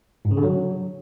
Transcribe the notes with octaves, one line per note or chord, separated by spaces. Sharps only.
G#2
C#3
D3
F#3